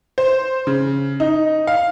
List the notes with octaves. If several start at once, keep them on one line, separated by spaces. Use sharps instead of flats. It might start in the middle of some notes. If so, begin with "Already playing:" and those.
C5
C#3
D#4
F5